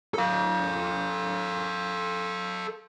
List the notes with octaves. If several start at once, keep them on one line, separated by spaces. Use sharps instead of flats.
A4 F5